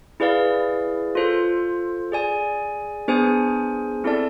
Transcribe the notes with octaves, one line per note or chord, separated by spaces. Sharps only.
E4 G#4 B4 D5 F5
F4 A4 C5
G#4 D5 G#5
B3 D4 G#4 C5 G#5
C4 E4 A4 D5 A5